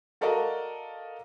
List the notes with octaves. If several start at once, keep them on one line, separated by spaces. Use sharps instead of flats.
F#4 A4 A#4 D5 D#5 F5